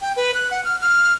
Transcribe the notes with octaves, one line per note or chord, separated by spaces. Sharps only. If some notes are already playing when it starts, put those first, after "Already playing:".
G5
B4
F#6
F#5
F6
F6